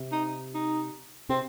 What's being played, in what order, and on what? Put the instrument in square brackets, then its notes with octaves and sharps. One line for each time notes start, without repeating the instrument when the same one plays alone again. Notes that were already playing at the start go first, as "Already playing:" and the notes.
Already playing: [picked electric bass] C3
[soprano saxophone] D#4
D#4
[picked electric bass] C3 [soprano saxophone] C4